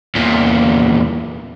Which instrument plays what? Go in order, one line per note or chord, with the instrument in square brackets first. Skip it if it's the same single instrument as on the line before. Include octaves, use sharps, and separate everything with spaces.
[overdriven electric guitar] E2 A#2